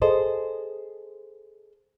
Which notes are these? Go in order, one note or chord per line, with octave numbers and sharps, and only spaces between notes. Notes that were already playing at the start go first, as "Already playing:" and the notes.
G#4 A4 C5 D#5